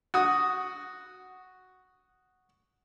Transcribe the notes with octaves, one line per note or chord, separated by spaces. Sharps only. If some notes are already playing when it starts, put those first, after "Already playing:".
F#4 D#6